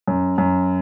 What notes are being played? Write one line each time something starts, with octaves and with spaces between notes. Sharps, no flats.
F#2
F#2